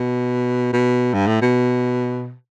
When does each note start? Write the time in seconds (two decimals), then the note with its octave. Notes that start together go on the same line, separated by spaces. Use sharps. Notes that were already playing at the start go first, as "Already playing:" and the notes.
Already playing: B2
0.73 B2
1.14 G2
1.27 A2
1.42 B2